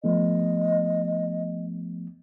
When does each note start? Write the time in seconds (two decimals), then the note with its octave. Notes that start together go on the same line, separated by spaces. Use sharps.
0.04 F3 A3 B3 D#5